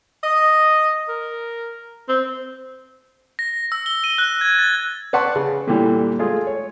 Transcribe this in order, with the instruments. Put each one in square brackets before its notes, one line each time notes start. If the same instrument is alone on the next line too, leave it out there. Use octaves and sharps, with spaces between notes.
[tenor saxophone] D#5
A#4
C4
[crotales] A#6
E6
G7
D#7
F#6
G#6
A6
[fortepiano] B4 D5 F#5 A5 C6 C#6
C#3
A#2 D3 E3 G3
G#3 A3 F4 G#4
C#5